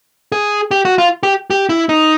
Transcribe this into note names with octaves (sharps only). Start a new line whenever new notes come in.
G#4
G4
F#4
F4
G4
G4
E4
D#4